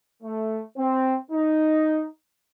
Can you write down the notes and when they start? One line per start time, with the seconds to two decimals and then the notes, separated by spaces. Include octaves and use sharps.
0.23 A3
0.77 C4
1.31 D#4